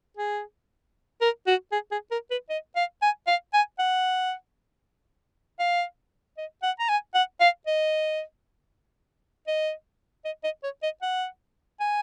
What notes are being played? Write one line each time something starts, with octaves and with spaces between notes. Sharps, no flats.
G#4
A#4
F#4
G#4
G#4
A#4
B4
D#5
F5
G#5
F5
G#5
F#5
F5
D#5
F#5
A#5
G#5
F#5
F5
D#5
D#5
D#5
D#5
C#5
D#5
F#5
G#5